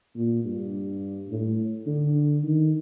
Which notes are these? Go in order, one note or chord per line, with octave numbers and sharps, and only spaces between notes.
A#2
G2
A2
D3
D#3